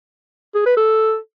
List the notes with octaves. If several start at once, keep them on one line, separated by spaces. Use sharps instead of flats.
G#4
B4
A4